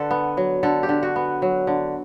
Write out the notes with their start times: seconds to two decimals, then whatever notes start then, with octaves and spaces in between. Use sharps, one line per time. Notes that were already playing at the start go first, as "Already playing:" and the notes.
Already playing: D3 A4 B4
0.11 B3
0.37 F#3
0.63 D3 A4
0.83 G4
0.89 D3
1.03 F#4
1.16 B3
1.42 F#3
1.67 D3